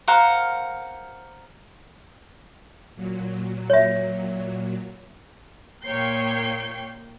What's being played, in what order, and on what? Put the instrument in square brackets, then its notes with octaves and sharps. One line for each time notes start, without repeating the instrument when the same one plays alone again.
[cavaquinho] A#4 C5 F5 F#5
[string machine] A#2 F#3
[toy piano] C#5 E5
[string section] A#2 A#3 C#5 G5 G6 C7